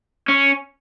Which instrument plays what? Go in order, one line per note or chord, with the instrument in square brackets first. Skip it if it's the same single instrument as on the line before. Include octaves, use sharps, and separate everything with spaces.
[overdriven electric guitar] C#4